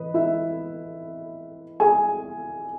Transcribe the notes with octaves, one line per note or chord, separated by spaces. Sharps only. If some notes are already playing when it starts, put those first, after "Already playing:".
Already playing: E3 B4 D#5
E4 E5
G#4 G#5